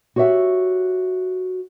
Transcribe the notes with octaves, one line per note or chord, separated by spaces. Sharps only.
F#4 G4 C#5 D5 E5 F#5